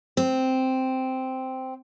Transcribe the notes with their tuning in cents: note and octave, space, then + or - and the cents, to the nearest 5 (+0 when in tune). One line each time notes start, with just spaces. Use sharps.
C4 -5